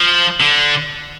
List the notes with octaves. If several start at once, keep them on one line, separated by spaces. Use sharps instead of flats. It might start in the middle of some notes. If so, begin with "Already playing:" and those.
Already playing: F3
D3